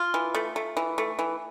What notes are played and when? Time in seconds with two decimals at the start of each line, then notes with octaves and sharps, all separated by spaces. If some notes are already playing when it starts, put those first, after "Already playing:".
Already playing: F4
0.14 E3
0.35 A3
0.56 A3
0.77 E3
0.98 A3
1.19 E3